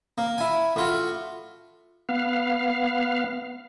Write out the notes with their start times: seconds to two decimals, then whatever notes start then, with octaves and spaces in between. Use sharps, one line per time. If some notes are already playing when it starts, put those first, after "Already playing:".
0.18 A#3
0.38 E4 G#5
0.76 A2 F4 F#4
2.09 B3 F5